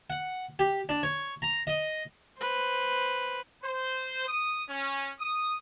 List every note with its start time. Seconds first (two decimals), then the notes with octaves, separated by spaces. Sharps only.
0.10 F#5
0.59 G4
0.89 D4
1.03 C#5
1.42 A#5
1.67 D#5
2.38 B4 C5
3.64 C5
4.27 D#6
4.69 C#4
5.20 D#6